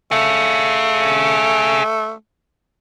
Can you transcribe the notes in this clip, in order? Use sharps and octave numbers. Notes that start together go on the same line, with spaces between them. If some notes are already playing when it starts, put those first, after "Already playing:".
A3 G#4 F5